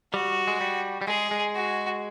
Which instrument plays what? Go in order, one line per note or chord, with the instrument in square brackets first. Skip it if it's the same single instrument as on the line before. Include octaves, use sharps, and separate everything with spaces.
[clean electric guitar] G3 [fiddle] F#4
[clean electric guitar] G#3
G3
G3
[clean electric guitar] G#3 [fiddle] G#4
[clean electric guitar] G#3
[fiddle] F#4